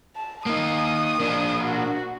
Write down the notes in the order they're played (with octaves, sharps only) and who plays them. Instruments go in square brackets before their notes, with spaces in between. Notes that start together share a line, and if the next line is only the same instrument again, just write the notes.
[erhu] A5
[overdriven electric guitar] A#3 D#4 [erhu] D#6
[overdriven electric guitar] A#3 D4
[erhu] F#4